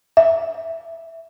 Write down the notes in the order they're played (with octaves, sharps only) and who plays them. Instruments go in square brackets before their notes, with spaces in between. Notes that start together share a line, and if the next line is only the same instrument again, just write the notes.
[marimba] E5